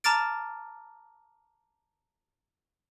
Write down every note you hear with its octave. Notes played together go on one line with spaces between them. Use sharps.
A5 A#5 D6 F6 A6 D7